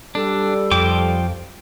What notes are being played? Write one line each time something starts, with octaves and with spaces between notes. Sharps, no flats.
G3 D4 A4
F2 F3 G5 D6